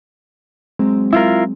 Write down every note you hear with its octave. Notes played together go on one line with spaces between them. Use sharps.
F#3 G#3 C4
E4 F4 A#4